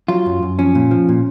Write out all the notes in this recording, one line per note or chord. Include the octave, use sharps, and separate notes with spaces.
F#3 F4
F#2
F#2
F3 C#4
A#2
F3
A#2